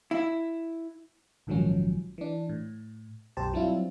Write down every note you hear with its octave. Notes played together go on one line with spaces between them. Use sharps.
E4
A#1 G#2 D#3 F3 F#3 C#4
E3 D4
A2
B1 F#2 G4 C5 A5
F#3 G3 C4 D4 E4 F4